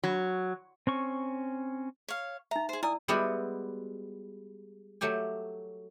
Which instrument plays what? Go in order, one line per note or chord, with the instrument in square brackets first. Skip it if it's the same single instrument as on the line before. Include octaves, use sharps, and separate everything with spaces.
[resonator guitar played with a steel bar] F#3
[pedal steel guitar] C4 C#4 C#6
[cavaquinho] C#5 F5
[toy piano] D#4 E5 [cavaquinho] A#5
[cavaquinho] G#4 C5
[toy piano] E4 D5 E6 [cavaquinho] G#5 D#6
[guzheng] G3 G#3 B3 E4 F#4 G4
F#3 A3 G4 G#5